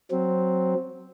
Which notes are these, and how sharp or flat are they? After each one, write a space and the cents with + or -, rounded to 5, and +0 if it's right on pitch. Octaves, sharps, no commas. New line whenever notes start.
F#3 +0 C4 +0